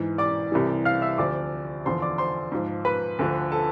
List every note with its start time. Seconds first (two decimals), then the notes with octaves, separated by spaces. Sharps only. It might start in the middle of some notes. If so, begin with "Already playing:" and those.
Already playing: G#2 E3
0.18 D5 D6
0.52 C2 C3 E3
0.85 F5 F6
1.02 E5 E6
1.18 D2 C3 F3 D5 D6
1.85 E2 D3 F3 C5 C6
2.02 D5 D6
2.18 C5 C6
2.52 G#2 F3
2.85 B4 B5
3.19 D2 D3 F3
3.52 A4 A5